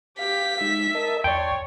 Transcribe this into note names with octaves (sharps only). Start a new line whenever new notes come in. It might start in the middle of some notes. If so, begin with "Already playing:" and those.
G4 F5 B6
G#3 D#4 E5
A#4 D#5 A5
E2 C#5 D5 G5 A5 C6